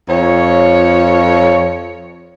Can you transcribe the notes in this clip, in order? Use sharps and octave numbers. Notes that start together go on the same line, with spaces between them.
F2 C#5